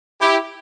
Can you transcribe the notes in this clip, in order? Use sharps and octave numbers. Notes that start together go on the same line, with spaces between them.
E4 G4